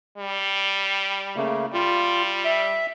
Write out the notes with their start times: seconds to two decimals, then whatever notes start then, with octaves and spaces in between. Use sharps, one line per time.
0.18 G3
1.36 C#3 A3 A#3
1.74 G3 F4
2.45 E5